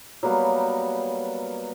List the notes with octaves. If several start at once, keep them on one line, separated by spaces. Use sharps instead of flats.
F#3 G3 A#3 B3